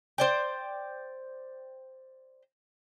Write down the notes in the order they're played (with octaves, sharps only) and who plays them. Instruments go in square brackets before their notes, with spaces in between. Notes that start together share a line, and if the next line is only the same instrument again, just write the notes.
[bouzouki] C5 D5 G5